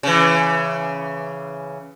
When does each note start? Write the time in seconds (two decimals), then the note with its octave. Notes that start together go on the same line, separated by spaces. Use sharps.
0.03 C#3 E3